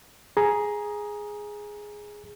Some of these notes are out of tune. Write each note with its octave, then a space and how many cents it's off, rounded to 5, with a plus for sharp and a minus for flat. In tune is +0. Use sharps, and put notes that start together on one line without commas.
G#4 +0 A#5 +15